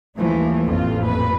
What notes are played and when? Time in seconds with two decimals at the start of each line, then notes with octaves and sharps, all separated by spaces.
0.16 D#2 E3 F3 G3 A3
0.65 A1 F2 F4
1.03 A#2 B4